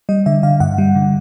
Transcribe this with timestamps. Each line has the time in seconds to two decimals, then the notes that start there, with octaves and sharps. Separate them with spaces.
0.09 G3 D#5
0.26 D3 E5
0.43 D3 F5
0.60 G2 F#5
0.78 G3
0.95 D3